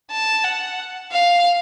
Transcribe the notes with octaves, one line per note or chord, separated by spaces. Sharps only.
A5
F#5
F5